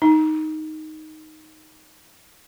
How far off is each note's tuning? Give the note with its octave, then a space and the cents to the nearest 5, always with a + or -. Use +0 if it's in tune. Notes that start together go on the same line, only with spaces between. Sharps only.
D#4 +5